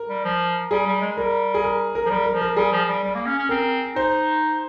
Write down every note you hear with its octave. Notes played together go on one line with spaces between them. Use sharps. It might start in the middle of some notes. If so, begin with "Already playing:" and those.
Already playing: A#4
G3
F3
G3 G#4
G3
G#3
G3 A#4
G#4
A#4
A#4
F3
G3 A#4
A#4
F3
A#4
G3 G#4
F3
G3
G3
A#3
C#4
C#4
C4 A#4
D#4 C5